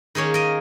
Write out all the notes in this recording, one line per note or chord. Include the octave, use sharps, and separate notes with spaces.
D#3 A#3 C#4 G#4 C#5
A#4 D#5